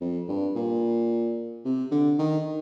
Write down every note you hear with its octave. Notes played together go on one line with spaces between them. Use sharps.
F2
G2
A#2
C3
D3
D#3